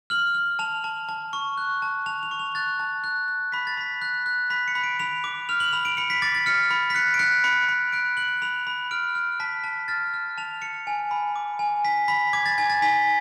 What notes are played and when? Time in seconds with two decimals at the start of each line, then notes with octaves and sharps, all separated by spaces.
0.10 F6 F#7
0.35 F6
0.59 A5 F7
0.84 A5
1.09 A5
1.33 C#6
1.57 F#6
1.82 A5
2.06 A5 F7
2.23 F7
2.31 C#6
2.39 F7
2.55 F#6 A6
2.80 A5
3.04 F#6
3.28 F#6
3.52 B5 B6
3.67 A6
3.77 B5 B6
4.02 F#6
4.26 F#6
4.50 B5 B6
4.68 C#7
4.75 B5
4.84 D7
5.00 B5 F7
5.24 D6
5.49 F6 F7
5.60 F#7
5.72 B5 F7
5.85 D7
5.97 B5 C#7
6.10 B6
6.22 D6 A6
6.35 A6
6.46 F6 C#7
6.71 B5
6.90 B6
6.95 F#6 C#7
7.14 D7
7.19 F#6 C#7
7.44 B5 C#7
7.69 B5
7.92 F#6 D7
8.17 F#6 F#7
8.42 B5 F7
8.67 B5
8.91 F6 D7
9.15 F6
9.40 A5 B6
9.64 A5
9.88 F6 A6
10.14 F6
10.38 A5 F7
10.61 A5 C#7
10.87 G#5
11.11 B5
11.36 D6
11.59 G#5
11.84 G#5 B6
12.08 B5 B6
12.33 D6 G#6
12.46 A6
12.58 G#5 G#6
12.70 A6
12.82 G#5 B6